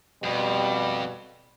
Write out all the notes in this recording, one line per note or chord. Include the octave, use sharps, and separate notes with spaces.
F2 B2 G3